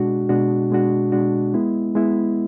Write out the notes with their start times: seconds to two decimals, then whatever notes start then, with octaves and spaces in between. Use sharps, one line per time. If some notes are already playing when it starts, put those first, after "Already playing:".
Already playing: B2 G#3 D4 F#4
0.29 B2 G#3 D4 F#4
0.70 B2 G#3 D4 F#4
1.12 B2 G#3 D4 F#4
1.54 G#3 B3 E4
1.95 G#3 B3 E4